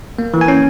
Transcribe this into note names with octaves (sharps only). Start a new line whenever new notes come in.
A#3
E3
G#5
C#4